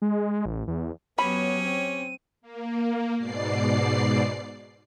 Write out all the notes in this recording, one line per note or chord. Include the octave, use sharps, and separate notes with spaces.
G#3
A1
E2
F#3 B3 C#4 G4 C#5 B5 D#7
C4
A#3
G#2 B2 D5 C7